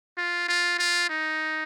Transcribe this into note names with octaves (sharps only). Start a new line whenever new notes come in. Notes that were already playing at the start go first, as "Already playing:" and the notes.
F4
F4
F4
D#4